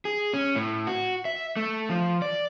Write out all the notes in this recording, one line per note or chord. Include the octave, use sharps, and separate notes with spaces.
G#4
C#4
A2
F#4
E5
A3
F3
D5